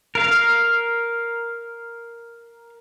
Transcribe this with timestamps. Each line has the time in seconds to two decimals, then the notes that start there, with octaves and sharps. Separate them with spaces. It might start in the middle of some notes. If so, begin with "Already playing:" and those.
0.15 A#4 F5